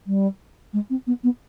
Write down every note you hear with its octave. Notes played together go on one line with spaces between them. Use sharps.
G3
G#3
C4
B3
B3